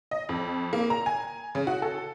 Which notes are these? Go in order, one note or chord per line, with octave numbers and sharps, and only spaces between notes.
D#5
F2
A#3
A#5
G#5
C#3
F#4
A4